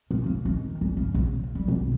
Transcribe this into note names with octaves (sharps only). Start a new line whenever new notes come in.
A#2
D#2
D#3
G1
C#3
A#1
G3
B1